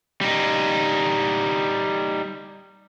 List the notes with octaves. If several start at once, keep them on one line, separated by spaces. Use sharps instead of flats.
G3 D#4